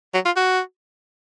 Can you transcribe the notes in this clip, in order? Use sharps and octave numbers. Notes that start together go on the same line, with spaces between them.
F#3
F4
F#4